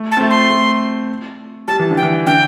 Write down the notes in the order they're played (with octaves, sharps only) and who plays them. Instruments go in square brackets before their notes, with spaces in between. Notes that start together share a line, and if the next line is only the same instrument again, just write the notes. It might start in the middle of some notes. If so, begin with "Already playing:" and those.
Already playing: [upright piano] A3
[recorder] A5
[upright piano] C4
A3
[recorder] C6
[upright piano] A3
[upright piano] G3 [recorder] A5
[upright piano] E3
D3
[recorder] G5
[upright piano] E3
[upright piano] D3 [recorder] G5